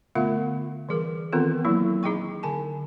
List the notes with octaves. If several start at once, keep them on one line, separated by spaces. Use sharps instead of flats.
D3 A3 B3 F4 F5 F#5
E3 G3 G#4 A#4
D#3 E3 B3 C4 F4 A4
F#3 A#3 E4
D#4 G#4 D#5 G5 C#6
D3 G#5 A5